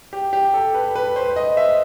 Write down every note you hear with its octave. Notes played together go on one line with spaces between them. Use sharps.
G4
G4
A4
B4
B4
C5
D#5
E5